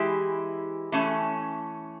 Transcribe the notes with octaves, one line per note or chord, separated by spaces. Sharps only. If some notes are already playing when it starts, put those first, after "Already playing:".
Already playing: E3 G#3 E4 G4
E3 A3 C#4